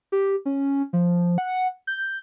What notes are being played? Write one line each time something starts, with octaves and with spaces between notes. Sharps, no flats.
G4
C#4
F3
F#5
G6